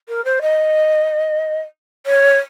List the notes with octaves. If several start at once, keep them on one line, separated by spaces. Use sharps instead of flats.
A#4
C5
D#5
C#5